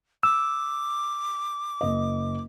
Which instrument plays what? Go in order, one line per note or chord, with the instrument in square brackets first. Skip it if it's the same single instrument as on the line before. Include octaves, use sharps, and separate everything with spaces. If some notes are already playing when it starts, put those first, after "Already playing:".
[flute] D6 [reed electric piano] E6
[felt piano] F#1 D#5